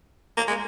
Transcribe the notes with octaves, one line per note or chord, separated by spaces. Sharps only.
A#3
G#3